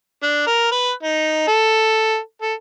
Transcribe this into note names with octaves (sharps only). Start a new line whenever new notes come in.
D4
A#4
B4
D#4
A4
A4